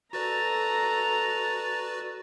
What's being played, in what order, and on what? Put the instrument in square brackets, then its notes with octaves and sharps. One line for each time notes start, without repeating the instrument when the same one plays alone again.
[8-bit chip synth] F#4 B4 D5 [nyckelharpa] A4 A#5 [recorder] A6